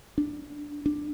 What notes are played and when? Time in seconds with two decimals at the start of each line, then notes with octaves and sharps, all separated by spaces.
0.18 D4
0.86 D4